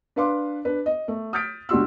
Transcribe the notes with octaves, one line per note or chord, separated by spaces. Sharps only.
D4 B4 F5 C6 D6
D4 B4
D#5
A3
D#6 F6 G6 A6 B6 D7
C#2 D4 F#4 G4 C6 E6